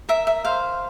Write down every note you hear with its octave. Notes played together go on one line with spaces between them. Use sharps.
A#4 E5
E5
C5 F5